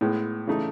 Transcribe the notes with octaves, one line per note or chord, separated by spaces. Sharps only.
A2 G#3 B3
C#3 E3 A3 D#4